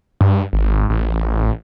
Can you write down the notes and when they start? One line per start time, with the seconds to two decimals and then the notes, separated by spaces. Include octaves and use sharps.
0.21 G2
0.53 G#1
0.90 A1